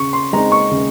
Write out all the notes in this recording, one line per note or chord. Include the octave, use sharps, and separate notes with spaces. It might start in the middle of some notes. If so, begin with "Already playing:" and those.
Already playing: C#3 C#6
C6
G#3 C4 D#4 A#5
C#6
C#3